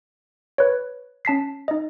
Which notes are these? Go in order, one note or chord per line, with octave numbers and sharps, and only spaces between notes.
B4 C#5
C#4 A5 B6 C7
D#4 D#5